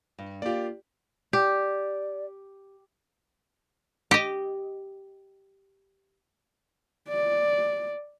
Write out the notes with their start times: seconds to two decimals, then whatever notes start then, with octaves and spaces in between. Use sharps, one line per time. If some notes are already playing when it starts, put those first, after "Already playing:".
0.19 G2
0.42 A#3 F4 G4 D5
1.33 G4 D5
4.11 G4 D#5
7.08 D5